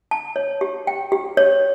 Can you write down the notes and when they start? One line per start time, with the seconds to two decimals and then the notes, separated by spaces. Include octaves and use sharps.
0.11 A5
0.36 C#5
0.61 G4
0.87 G5
1.12 G4
1.37 C#5